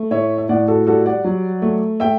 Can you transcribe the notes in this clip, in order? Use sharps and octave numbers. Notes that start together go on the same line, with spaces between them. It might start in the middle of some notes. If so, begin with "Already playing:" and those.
Already playing: A3
A2 C#5 E5
E5
A2 D5 F#5
F#4 A4
G3 F#4 A4
D5 F#5
F#3
A3
A3 E5 G5